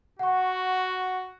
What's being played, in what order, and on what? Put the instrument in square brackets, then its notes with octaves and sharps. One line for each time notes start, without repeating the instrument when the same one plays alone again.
[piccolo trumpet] F#4 [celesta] F#5 C#6